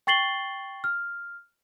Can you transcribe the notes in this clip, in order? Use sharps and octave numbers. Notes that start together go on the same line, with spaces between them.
G5 C#6 A6 C7 F#7 G7
F6